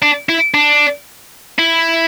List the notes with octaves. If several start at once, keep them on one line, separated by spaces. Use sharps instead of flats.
D4
E4
D4
E4